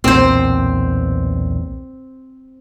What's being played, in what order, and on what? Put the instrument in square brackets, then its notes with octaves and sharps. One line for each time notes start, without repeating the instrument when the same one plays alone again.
[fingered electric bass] B1 E2 A#2 [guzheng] C4 C5